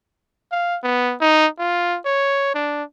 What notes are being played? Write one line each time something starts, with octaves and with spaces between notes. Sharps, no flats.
F5
B3
D#4
F4
C#5
D4